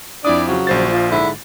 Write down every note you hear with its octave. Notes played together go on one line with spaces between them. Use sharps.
F2 D4 E4 D5 D#6
C#3 F3 F#3
A#1 C5 A6
F3
G#2 D3 E4